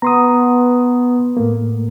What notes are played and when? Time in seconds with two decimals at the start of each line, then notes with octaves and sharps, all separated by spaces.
0.02 B3 A#5 C6 D#6
1.37 A2 A3 A#3